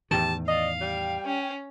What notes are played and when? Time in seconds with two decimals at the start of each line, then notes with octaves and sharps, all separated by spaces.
0.11 E2 A2 D#3 G4 A5
0.48 D5 D#5 F5
0.81 G3 G5
1.26 C#4